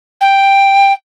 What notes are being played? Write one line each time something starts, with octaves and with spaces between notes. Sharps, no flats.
G5